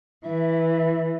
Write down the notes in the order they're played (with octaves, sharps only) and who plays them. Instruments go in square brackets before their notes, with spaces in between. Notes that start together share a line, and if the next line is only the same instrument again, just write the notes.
[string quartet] E3 [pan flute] E5